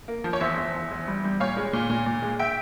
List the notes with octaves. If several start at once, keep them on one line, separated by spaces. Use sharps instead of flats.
A#3
F3
C#5
E2 C5 E5
E2
E2
E2
G3
G3
A#2 C#5 F5
G#3
A#2
A#2
A#2
G#3
E5 G5